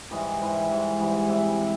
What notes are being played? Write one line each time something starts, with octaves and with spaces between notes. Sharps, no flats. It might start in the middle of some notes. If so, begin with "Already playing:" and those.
G#2 E3 G3 D#5
G#2 E3 G3
G#2 E3 G3
G#2 E3 G3
C3 E3 G3 E5
C3 E3